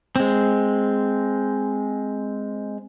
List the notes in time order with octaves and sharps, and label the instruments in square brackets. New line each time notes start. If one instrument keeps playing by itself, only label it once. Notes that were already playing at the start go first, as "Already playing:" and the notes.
[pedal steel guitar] G#3 C4